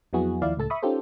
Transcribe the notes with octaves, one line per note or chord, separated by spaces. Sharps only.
F2 F#3 B3 E4 F#4 G#4
D#2 F3 E4 D5 F5
C#2 A2 A4 A5
E5 B5 C#6 D#6
C#4 D#4 F4 G4 A4 C5